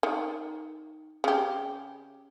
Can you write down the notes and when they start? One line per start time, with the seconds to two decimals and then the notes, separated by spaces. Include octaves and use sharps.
0.03 D#3
1.24 C#3 G4